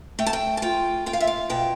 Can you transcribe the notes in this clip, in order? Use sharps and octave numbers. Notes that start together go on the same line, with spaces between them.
A3 G5
A5
G5
A5
F4 G5
F4 G5
F5
E5
F5
B2 G5